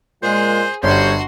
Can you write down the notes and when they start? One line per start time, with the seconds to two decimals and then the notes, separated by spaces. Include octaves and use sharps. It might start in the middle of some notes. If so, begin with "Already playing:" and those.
0.23 A#2 G#3 G#4 C5
0.83 G1 G3 C#4 F#4 C5 C#5 C6